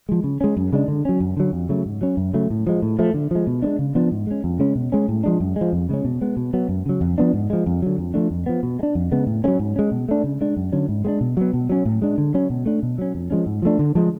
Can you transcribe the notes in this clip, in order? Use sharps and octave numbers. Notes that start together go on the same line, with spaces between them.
F3 G#3
C#3
G#3 C#4
F#2
C#3 G#3 D4
D3
F#3 C#4
F#2
D3 F#3
F2
C#3 F#3 A3
G#2
F#3 C#4
F#2
C#3 F#3 A3
A2
F3 G#3
A2
F3 A3
D3
F3 G#3
B2
G#3 B3 D4
C#3
F3 B3 D4
G#2
G#3 C#4
F2
C#3 G#3 C#4
B2
G#3 C#4
A2
F3 G#3 D4
F#2
G#3
F3
F2
C#3 G#3 C#4
B2
G#3 B3
B2
F#3 B3
F#2
C#3 F#3
F2
F3 B3 D4
G#2
F3 G#3
F2
D3 F#3
F2
F3 A3 D4
F2
F3 B3
B2
G#3
D4
F2
C#3 G#3 B3
A2
F#3 A3 C#4
G#2
G#3 C#4
B2
A3 D4
C#3
G#3 D4
F#2
D3 F#3 C#4
G#2
G#3 B3 D4
B2
F#3 B3
B2
F#3 C#4
A2
G#3 D4
D3
F#3 C#4
B2
A3 D4
B2
F#3 C#4
F2
F3 G#3 C#4
G#2
F3 A3 D4
D3
F3 G#3